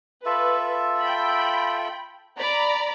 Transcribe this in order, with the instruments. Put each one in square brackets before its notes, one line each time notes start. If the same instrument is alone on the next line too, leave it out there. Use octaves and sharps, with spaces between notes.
[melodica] F4 A4 E5 [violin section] B4
[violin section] G5 B5
D5 A#5 B5